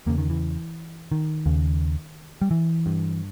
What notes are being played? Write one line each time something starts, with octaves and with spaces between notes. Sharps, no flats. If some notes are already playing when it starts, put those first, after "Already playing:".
E2 C#3 A#3
D#3
E3
D#3
D#2 C#3
G3
E3
G2